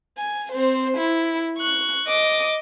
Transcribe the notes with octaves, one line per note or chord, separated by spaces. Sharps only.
G#5
C4 C5
E4
C#6 F#6
D#5 D6